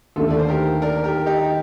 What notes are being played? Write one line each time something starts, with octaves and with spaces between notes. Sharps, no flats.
D#2 D3 A3 F4 A4
D5
C5
G4 A#4
A#4 D5
G4 A#4
D#4 G4